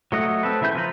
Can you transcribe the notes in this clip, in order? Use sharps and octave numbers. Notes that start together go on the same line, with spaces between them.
F#3 A3 D#5 F#5
C4 A4 B4
C#3 E3 E5 B5 G6
F3 F4 B4 A#5 B5